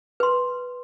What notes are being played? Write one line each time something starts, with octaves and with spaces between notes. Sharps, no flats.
B4 C6